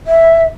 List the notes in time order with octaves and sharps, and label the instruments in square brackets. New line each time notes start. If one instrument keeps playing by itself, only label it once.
[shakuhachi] E5